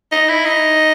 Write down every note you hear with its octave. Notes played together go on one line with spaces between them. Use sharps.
D#4
E4
D#4